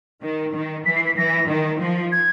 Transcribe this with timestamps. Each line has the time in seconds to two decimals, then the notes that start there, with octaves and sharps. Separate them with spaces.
0.22 D#3
0.54 D#3
0.86 E3 B6
0.96 C7
1.07 B6
1.17 E3 A#6
1.48 D#3
1.80 F3
2.12 G#6